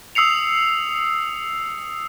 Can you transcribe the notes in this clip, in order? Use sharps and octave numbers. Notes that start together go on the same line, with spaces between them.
D#6 E6 C7 C#7 F7